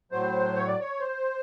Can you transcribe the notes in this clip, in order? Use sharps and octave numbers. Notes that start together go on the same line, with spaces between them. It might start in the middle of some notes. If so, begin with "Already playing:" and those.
A2 F#3 C5
C#5
D5
C#5
C5